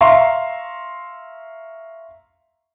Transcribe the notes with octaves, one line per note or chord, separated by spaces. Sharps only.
E5 F5 A#5 C6 C#6